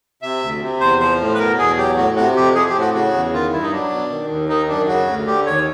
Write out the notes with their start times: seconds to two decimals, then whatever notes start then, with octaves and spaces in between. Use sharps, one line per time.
0.22 C3 E5
0.42 D2
0.61 C3
0.81 E2 C5
1.00 F3 C5
1.20 A2
1.34 B4
1.39 B2 A#4
1.58 E2 G#4
1.77 F#3 G4
1.97 A2 F#4
2.16 C3 F#4
2.35 F2 G4
2.55 F3 G#4
2.68 G4
2.74 A2
2.81 F#4
2.94 C#3 F#4
3.13 E2
3.33 D#3 F4
3.52 G2 E4
3.63 D#4
3.71 F#3 D4
3.91 B2
4.10 D#3
4.30 D#2
4.49 D#3 D#4
4.68 F#2 D4
4.88 C#3 F#4
5.07 D2
5.27 D3 G4
5.46 D#2 C#5